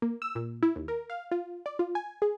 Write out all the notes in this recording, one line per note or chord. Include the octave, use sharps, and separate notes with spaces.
A#3
E6
A#2
E4
D#2
A#4
F5
F4
D5
F4
G#5
G#4